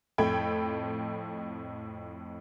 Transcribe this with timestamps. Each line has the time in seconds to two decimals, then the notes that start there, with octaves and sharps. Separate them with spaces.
0.18 F2 A2 A4 G5 B5 G#6